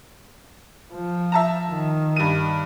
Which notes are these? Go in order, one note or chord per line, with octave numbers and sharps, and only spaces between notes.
F3
E5 A5 A#5
D#3
G2 D#7